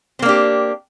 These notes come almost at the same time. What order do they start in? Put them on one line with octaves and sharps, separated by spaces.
C4 A#3 D4 G4